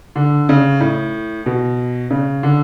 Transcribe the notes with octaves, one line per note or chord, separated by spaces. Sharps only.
D3
C#3
A2
B2
C#3
D3